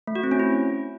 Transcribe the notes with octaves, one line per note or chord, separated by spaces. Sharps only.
A3
F#4
C4
C#4
E4